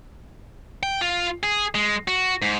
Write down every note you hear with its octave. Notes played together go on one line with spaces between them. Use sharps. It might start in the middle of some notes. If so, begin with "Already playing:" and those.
G5
F4
G#4
G#3
F#4
G#2